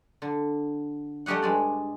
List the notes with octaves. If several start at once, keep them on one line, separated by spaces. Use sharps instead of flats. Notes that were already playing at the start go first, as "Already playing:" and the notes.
D3
G3 A3 G4 D#5 F#5
G2 G#3 D5